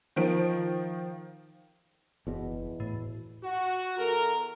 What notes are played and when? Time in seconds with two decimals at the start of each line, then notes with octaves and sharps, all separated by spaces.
0.16 D#3 F3 D7
2.27 F#1 E2 B2
2.80 A2
3.43 F#4
3.97 E2 A4 A#4